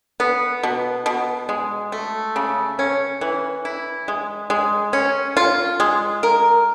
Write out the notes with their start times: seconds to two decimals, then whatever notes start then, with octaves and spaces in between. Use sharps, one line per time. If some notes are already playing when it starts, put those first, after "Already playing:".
0.20 B3
0.63 B2
1.06 B2
1.49 G#3
1.92 A3
2.36 C#3
2.79 C#4
3.21 E3
3.65 E4
4.08 G#3
4.50 G#3
4.93 C#4
5.37 F4
5.80 G#3
6.23 A#4